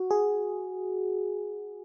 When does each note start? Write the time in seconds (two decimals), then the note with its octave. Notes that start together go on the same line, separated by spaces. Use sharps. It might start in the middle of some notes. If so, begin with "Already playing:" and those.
Already playing: F#4
0.11 G#4